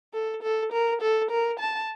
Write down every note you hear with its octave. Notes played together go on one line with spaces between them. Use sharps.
A4
A4
A#4
A4
A#4
A5